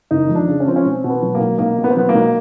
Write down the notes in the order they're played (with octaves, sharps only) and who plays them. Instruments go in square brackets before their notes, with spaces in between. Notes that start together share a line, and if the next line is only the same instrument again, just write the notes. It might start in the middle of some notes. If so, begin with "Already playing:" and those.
[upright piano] F#1 D#4
F2
D4
C#3
C#4
F3 C4
C#4
B1 C4
B2
B3
F#3
A#3
B1
B1 A#3
B2
B3
C4
F#3 B3
A#3
B1